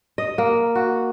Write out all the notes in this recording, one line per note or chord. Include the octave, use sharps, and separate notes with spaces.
D#5
A#3
F#4